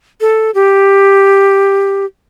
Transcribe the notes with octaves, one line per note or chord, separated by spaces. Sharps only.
A4
G4